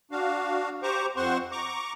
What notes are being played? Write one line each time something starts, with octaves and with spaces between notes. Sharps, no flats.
D4 F#4 F5
G4 C5 A#5 C#6 D6
F2 C4 C5 F#5 C6 C#6
A#5 C#6 D6